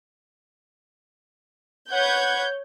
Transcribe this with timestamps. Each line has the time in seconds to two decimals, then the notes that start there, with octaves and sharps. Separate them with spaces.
1.92 B4 C#5 F#5 G6 G#6